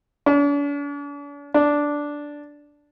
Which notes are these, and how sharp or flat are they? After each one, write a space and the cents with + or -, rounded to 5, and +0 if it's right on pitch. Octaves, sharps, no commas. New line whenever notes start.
D4 -45
D4 -5